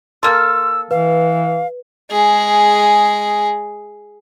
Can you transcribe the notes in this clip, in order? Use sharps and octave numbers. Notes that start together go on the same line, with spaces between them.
A#3 A4 C6 E6 F6
E3 B4 F5
G#3 G#4